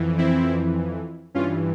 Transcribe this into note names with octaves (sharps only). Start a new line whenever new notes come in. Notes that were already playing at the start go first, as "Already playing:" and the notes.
Already playing: F2 E3
C4 E4
G2 E3 C#4 F4